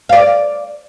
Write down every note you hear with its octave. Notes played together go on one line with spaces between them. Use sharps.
D5 F5